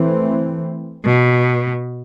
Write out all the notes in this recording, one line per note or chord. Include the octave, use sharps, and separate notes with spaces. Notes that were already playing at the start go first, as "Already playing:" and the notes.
Already playing: E3 A3 C4
B2